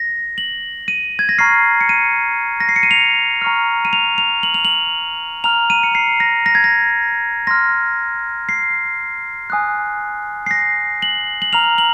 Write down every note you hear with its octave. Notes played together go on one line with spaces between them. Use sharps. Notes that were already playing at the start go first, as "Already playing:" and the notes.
Already playing: A#6
F#7
D#7
G#6
A#6
A#5 C#6 F6 C7
C#7
D#7
A#6
C7
C#7
D#7
F7
A#5 C#6 F6
D#7
F7
F7
F#7
F7
F#7
A#5 F6 F7
D#7
C#7
C7
A#6
A#6
G#6
A#6
C6 F6 A#6
C7
G#5 D#6 F#6
C7
A#6
F#7
F#7
A#5 F6 F7
F#7